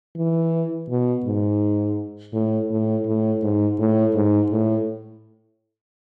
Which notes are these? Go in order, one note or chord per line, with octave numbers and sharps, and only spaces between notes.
E3
B2
G#2
A2
A2
A2
G#2
A2
G#2
A2